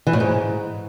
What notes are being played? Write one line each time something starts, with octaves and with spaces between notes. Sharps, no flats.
E3
A2
G#2